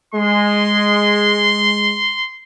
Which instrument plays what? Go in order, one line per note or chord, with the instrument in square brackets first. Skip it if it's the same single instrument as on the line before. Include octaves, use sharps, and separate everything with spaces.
[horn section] G#3 [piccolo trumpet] C6